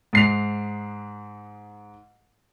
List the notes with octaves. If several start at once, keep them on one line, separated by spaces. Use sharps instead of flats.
G#2 C7 F7